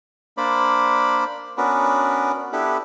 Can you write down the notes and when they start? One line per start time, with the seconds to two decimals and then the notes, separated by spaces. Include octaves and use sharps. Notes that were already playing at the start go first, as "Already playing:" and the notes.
0.37 A#3 D4 C5 D5 B5
1.58 B3 C#4 D4 F#4 A#4 B4
2.53 B3 D4 E4 G4 A4 B4